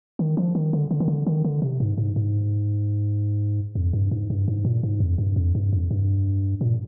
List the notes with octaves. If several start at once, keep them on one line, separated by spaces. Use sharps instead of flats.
D#3
F3
D#3
D3
D3
D#3
D3
D#3
D3
C3
G#2
G#2
G#2
F2
G2
G#2
G2
G#2
A#2
G#2
F2
G2
F2
G2
F2
G2
A#2